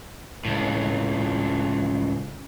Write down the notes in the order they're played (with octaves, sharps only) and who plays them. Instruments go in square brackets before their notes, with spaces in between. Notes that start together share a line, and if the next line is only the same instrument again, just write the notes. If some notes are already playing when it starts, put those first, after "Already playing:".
[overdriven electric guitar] C#2 A2